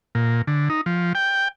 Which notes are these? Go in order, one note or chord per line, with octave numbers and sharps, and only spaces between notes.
A#2
D3
D#4
F3
G5